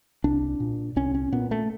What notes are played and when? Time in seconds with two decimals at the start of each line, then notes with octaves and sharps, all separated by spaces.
0.24 C2 D4
0.60 A#2
0.96 C2 C#4
1.15 C#4
1.32 A#2 B3
1.51 A3